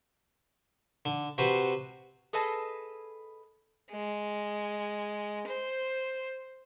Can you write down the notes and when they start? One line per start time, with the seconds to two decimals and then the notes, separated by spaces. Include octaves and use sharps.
1.05 D3
1.38 C3 F#4 B4 C5
2.33 G#4 A4 B4 D#5 A5
3.91 G#3
5.47 C5